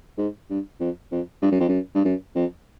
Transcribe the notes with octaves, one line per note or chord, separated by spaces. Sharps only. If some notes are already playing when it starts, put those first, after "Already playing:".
G#2
G2
F2
F2
G2
F#2
F2
F#2
G2
F#2
F2